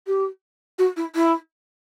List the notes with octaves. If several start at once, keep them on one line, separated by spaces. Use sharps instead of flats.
G4
F#4
E4
E4